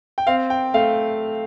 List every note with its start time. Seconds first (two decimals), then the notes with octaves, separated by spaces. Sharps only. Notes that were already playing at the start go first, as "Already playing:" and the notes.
0.18 G5
0.27 C4 F5
0.50 G5
0.74 A3 F5